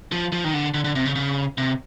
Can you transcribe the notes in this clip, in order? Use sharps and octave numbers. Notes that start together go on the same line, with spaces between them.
F3
F3
D#3
D3
D3
D3
C3
C#3
C#3
C3